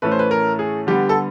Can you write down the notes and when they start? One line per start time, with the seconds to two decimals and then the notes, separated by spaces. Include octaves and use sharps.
0.02 A2 E3 A3 C#4 B4
0.12 C5
0.19 B4
0.31 A#4
0.59 G#4
0.87 D3 G3 B3 G4
1.09 A4